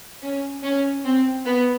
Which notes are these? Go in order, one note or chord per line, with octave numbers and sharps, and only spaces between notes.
C#4
C#4
C4
B3